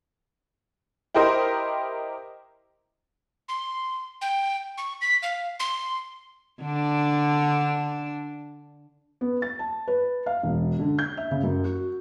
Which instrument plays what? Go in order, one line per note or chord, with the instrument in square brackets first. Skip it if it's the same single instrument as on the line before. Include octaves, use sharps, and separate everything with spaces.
[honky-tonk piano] E4 G4 A#4 C5 D#5
[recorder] C6
G5
C#6
B6
F5
C6
[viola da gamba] D3 D4
[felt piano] B3
A6
A5
B4
F5
E1
D3
G6
E5
C#3
F#2
F#4